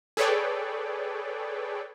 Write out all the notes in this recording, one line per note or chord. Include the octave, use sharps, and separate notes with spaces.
G#4 A4 B4 C#5 D5 G5